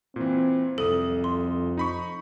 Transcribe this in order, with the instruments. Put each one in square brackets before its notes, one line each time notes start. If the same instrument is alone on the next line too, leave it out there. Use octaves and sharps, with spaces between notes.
[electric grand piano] A#2 E3 [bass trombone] C4
[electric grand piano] C2 D#6 [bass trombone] F2 [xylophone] A4
[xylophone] C6
[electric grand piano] D#4 B5 C#6